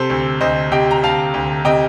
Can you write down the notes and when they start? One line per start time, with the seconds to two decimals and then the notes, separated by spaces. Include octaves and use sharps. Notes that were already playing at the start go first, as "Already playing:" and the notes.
Already playing: C3 A4 C5
0.10 D2
0.41 D2 C5 D#5
0.72 C3 D#5 G5
0.91 A#5
1.03 D2 F5 A5
1.34 D2
1.65 C3 D#5 G5